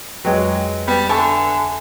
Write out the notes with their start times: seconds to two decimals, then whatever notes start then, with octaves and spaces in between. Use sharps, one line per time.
0.25 F2 F#3 G#3 B4 G5
0.88 G3 B3
1.09 D3 E5 G#5 A5 C#6